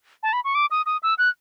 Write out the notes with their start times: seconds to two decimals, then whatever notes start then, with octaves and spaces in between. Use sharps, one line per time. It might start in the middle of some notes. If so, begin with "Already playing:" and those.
0.23 A5
0.33 B5
0.44 C#6
0.55 D6
0.71 D#6
0.86 D#6
1.03 E6
1.18 F#6